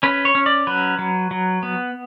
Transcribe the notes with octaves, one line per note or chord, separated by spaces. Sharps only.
C#4 B4
C#5
C#4
D5
F#3 B4
F#3
F#3
B3